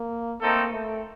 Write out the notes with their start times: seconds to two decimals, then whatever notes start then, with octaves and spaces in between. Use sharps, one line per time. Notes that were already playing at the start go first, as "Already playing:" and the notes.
Already playing: A#3
0.41 A3 A#3 C4 D#4 A4
0.73 A3